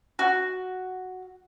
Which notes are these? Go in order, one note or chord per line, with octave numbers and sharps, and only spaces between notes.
F#4